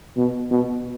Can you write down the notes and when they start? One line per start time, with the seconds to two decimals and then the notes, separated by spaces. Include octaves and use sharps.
0.17 B2
0.51 B2